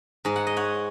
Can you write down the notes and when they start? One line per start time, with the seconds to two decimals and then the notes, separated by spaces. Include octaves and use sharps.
0.25 G#2 G#3
0.36 F#5
0.47 D#5
0.56 C#5 F#5